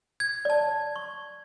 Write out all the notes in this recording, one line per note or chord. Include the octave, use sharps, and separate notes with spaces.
G#6
D5 A5
C#6